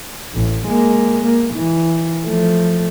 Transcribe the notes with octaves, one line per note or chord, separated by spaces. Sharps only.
A1
G#3 A#3
A#3
E3
F3 A3